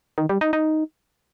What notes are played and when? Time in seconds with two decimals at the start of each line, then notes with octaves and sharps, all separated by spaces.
0.18 D#3
0.29 G3
0.41 D#4
0.53 D#4